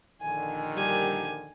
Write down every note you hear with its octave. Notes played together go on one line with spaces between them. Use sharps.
A#1 D3 D#3 G#5
G3 G4 A#4 G#5